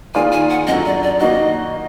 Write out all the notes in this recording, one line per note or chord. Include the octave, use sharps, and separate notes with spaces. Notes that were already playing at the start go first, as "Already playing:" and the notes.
D#3 A#3 F4 G#4 D5 G#5
G#5
F#5
F#2 D3 F#3 D#5
D5
D5
D#3 A#3 D#4 F#4 D#5